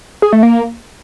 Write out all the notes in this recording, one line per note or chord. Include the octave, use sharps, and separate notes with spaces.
G#4
A3
A#3